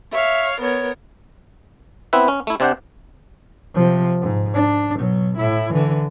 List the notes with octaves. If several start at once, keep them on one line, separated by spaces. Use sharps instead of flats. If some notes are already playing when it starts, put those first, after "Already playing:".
C#5 E5 F5
B3 A#4 C#5
B3 C4 E4 B4 E5
C#4
A3 E4
C3 C4 D4 C5 F#5
C3 F3
G#2
D4
B2 F#3
A2 E4
D3 E3